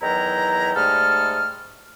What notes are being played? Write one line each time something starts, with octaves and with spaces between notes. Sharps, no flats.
E2 D#3 F#3 E4 G5 A#5
G#2 G3 A3 A4 D#5 F6